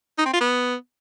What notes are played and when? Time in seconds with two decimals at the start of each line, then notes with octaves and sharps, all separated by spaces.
0.18 D#4
0.26 C4
0.33 F4
0.40 B3